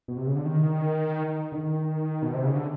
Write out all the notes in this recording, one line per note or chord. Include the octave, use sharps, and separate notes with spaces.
B2
C3
C#3
D3
D#3
D3
D#3
B2
C3
C#3
D3